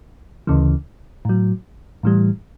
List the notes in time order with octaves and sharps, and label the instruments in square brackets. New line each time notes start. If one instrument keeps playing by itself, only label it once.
[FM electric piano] D2 C#3 E3
A2 F#3
A2 E3 G3